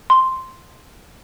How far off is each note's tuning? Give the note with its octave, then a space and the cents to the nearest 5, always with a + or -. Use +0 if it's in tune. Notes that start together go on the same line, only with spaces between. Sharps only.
C6 +0